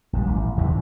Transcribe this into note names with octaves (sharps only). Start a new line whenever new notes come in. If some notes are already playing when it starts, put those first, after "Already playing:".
A#1 G#2 D#3 G3
A1
E2 C3 D#3 E3